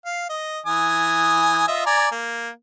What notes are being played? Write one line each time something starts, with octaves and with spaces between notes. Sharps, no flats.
F5
D#5
E3 G#5 D#6
F4 D#5 E5
D5 G#5 A#5
A#3